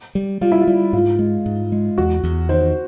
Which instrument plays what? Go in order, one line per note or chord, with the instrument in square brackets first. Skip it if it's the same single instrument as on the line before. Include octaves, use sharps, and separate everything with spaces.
[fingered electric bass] G3
[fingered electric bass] G3 [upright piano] F4
[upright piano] E4
F4
[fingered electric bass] G3
[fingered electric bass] G#2 [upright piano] F4
[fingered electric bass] G#3
G#2
G#3
[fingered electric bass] E2 [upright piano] F#4
[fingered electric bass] E2
[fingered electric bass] D#3 [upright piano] C5